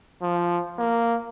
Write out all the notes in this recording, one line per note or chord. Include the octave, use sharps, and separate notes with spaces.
F3
A#3